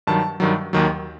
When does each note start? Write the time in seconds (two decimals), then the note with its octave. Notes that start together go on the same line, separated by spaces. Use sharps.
0.07 G2 D#3 F#3 A5
0.40 G2 D#3 F#3
0.73 D#2 D#3 F#3